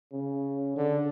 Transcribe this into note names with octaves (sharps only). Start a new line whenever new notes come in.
C#3
D3